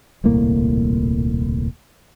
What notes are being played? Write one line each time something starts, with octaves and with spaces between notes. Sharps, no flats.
D#1 C2 A2 A#3